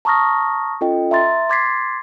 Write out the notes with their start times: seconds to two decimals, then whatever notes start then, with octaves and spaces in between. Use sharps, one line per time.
0.05 A5 A#5 C#6 D#6 F6 A#6
0.81 C#4 F4 A4 D#5 G5
1.11 E5 A#5 C6 A6
1.49 C6 D6 G#6 A6 B6 C7